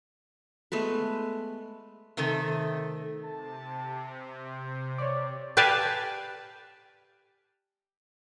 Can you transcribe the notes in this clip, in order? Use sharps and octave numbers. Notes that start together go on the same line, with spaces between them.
G#3 A3 B3 B4
C3 D#3 A3 A4
C3 A5
C5
C#5 D5 D6
G4 B4 D5 F5 G#5 A5